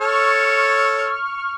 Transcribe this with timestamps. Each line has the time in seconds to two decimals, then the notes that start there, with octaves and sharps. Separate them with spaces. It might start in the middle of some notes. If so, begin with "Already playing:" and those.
0.01 A4 C#5 C#6 F6